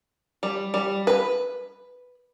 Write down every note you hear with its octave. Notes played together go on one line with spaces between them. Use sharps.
G3
G3
B4